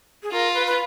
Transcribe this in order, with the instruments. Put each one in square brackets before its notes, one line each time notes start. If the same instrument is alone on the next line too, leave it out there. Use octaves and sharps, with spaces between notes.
[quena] G#4
[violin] F4 [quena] A#4
[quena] B4
B4